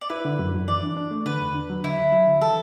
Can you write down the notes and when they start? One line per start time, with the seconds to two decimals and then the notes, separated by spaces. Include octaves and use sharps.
0.01 D5
0.10 E4 B4
0.25 D3
0.39 F#2
0.54 F#2
0.68 E3 D5
0.83 D4
0.97 D4
1.11 A3
1.26 D3 B4
1.41 E2
1.55 D4
1.70 F#3
1.84 D3 E4
1.98 D2
2.12 F#3
2.27 D3
2.41 E3 A4